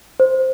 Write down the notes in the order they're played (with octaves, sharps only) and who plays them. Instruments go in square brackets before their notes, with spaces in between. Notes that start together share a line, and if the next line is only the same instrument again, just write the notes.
[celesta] C5